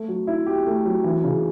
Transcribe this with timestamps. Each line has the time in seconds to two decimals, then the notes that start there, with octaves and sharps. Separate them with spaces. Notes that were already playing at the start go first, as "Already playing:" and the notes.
Already playing: A3
0.08 F#3
0.27 E4
0.47 G4
0.66 A3
0.86 F#3
1.04 E3
1.24 C#3